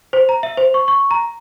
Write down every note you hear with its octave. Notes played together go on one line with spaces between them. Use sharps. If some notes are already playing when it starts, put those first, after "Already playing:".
C5
A#5
E5
C5
C#6
C#6
A#5